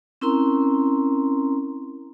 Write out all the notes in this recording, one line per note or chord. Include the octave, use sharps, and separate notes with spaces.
C4 C#4 E4 A#4 A#5 C6